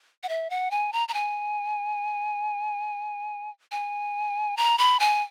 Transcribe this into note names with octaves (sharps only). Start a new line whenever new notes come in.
F#5
E5
F#5
G#5
A#5
A#5
G#5
G#5
A#5
B5
G#5